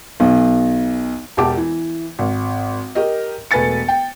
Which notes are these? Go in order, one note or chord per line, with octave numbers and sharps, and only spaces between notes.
B1
E1 E2 G4 A5 D6
E3
G#1
G4 A#4 D#5
E1 A3 B4 G#5 A6 C#7
G5